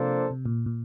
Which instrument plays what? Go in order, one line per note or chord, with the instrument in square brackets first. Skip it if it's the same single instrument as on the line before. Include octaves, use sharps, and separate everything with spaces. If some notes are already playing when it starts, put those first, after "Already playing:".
Already playing: [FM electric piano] C3 [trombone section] F3 A#3 D4 A4 C5
[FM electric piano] C3
A#2
A#2